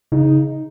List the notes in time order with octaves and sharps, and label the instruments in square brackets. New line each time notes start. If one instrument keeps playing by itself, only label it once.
[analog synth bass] C#3 [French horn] D#4